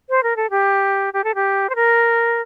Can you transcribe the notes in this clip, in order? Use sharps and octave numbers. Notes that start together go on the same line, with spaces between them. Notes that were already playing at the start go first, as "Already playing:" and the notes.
C5
A#4
A4
G4
G4
A4
G4
C5
A#4